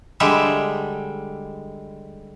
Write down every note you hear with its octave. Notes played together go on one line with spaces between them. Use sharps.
D3 G3 G#3 E5